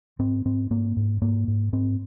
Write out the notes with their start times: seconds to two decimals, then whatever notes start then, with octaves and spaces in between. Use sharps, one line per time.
0.19 G#2 C4
0.45 G#2 C4
0.70 G#2 A#3
0.96 G#2
1.22 G#2 A#3
1.48 G#2
1.73 G#2 C4